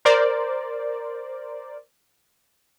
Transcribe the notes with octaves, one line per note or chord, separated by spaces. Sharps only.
A#4 C5 D5